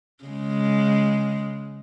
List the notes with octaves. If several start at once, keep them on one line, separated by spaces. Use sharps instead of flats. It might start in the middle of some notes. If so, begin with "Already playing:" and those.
C#3 G#3